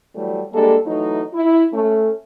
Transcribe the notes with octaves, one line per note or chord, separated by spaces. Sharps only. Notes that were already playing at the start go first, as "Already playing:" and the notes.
E3 F#3 G3 A3
G3 G#3 A#3 D4 G4 A4
E3 F#3 A3 D#4
E4
A3 C#4